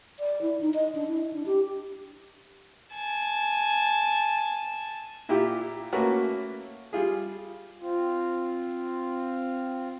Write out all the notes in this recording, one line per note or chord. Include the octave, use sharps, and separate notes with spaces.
D5
E4
D#4
D#5
D4
E4
D4
G4
G#5 A5
A#2 E4 F4 G4
A3 A#3 C#4 F#4 A#4 B4
G3 F4 G#4
C4 F4